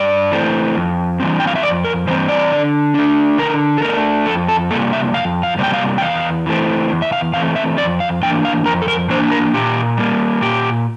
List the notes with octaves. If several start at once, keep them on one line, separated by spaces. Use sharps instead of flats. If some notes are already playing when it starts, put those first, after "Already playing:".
Already playing: G2 D5
E3 A3 C4
F2
E3 G3 C4
G5
F5
E5
F2 D5
A#4
E3 G3 C4 C5
D5
D3
A3 D4
D3 A#4
A4
A3 D4 A#4
F2 A4
A4
C3 G3 A#3 A4
E5
F2 F5
F5
C3 G3 A#3 G5
F5
G5
E2 F5
E3 A3 C4
E2
E5
F5
E3 A3 C4 F5
E5
F2 D5
F5
E3 A#3 D4 G5
F5
F2 A#4
A4
A#4
E3 A#3 D4 C5
A#4
A#2 G4
G3 A#3
A#2 G4